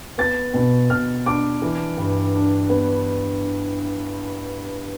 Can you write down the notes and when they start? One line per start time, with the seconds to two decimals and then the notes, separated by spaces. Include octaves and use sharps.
0.18 B3 A6
0.54 B2
0.90 B2 F6
1.26 D4 D6
1.62 E3
1.97 G2
2.34 D4
2.69 B3